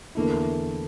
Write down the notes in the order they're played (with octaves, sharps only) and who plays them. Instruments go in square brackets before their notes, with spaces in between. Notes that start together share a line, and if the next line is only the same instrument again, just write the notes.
[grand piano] E2 D3 A3 E4 [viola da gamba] A#3